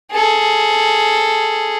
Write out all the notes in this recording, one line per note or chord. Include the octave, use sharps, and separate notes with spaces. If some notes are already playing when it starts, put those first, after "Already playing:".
G#4 A4